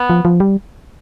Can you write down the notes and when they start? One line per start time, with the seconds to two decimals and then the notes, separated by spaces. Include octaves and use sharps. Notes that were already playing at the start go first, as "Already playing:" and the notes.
Already playing: B3
0.10 F3
0.25 F3
0.40 G3